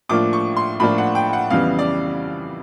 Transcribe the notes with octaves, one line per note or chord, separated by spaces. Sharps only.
A2 F3 A#3 D4 F4 D6
C#6
C6
A2 F3 A#3 D4 F4 B5
F#5
G5
F#5
F2 C#3 E3 G3 B3 F5
D5